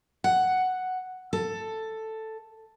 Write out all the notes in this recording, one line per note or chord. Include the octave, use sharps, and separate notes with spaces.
F#5
A4